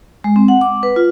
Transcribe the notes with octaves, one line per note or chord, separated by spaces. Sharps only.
G#3
C4
F#5
D6
B4
F4